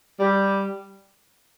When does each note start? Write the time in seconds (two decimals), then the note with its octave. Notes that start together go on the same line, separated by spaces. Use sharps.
0.20 G3